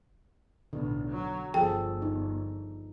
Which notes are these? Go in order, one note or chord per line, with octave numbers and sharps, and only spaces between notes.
B1 A2 D3
F#3
G1 F3 G#4 A4 G5
D#4